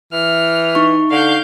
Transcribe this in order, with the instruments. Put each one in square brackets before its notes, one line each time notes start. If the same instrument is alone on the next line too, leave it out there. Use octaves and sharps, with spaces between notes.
[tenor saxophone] E3 [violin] F6
[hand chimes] D#4 C#6
[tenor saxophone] D3 [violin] F5 G6